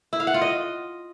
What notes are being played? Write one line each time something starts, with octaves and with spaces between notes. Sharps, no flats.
E4
F5
F#5
F4
D#5